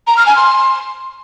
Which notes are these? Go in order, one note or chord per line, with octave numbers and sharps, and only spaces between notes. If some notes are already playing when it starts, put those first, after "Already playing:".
A#5
F6
G#5
C6